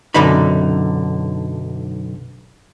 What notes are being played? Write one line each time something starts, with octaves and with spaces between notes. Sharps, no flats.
B1 F#2 D3 D#4 B5